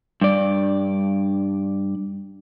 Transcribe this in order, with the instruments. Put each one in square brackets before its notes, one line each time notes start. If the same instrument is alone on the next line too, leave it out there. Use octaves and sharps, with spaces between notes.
[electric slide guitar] G2 D5